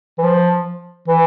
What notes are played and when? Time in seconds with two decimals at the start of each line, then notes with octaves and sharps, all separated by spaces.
0.18 E3
0.23 F3
1.08 E3